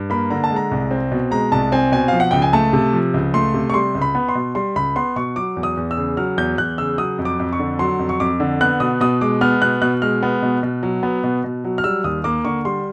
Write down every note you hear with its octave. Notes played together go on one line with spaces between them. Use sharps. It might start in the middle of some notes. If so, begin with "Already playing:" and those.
Already playing: G2
A#3 B5
D3 A#5
A5
G#3
A#5
C2
C4
B2
G#3 A#5
C2 A5
C4 G#5
B2 G#5
F3 F5
F#5
C#2 G5
G#5
A3 A5
C3
F3
C#2
A3 C6
C3
C#6
G3 C6
C#2
B5
B3
C6
B2
G3 C6
C#2 B5
B3 C6
B2 C#6
F#3 D6
E2
D#6
E2
E6
C#3
F#3 F6
E2 G6
E2 F#6
C#3 E6
F#3 D#6
F2
D6
F2
C#6
D3
F#3 C6
F2
C#6
F2 D6
D3
B3 F#6
B2 D#6
B2 D#6
G#3 D6
B3 F6
B2 F#6
B2 F#6
G#3 F6
B3
B2
B2
F#3
B3
B2
B2
F#3
F6
G3 E6
D#2 D#6
A#3 D6
D3 C#6
G3 C6